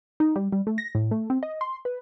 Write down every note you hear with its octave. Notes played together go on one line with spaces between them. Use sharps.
D#4
G3
G3
A3
A#6
A2
A3
C4
D#5
C6
B4